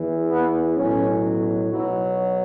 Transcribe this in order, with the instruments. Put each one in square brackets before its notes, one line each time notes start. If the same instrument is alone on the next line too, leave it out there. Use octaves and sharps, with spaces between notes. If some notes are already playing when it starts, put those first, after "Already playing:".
Already playing: [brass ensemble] E2 E3
B3
B1 A2 F#3 C#4
B1 B2 F#3 E4